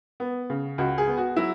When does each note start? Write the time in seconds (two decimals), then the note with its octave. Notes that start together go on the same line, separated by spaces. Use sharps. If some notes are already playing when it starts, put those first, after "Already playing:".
0.20 B3
0.50 C#3
0.78 C#2 F#4
0.98 G#4
1.08 B3
1.17 F#4
1.36 F#3 E4